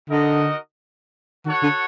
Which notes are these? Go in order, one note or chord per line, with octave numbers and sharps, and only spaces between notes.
D3 D#4 F#4 A#4 D#5
D#3 F#4 A4 C#5 F#5
D3